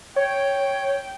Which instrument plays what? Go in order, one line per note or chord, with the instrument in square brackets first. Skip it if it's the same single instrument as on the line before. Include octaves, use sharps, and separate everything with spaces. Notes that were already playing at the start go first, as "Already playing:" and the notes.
[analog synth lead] C#5 [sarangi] G5